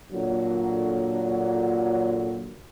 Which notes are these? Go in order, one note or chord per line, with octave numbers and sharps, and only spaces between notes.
A#2 D3 F#3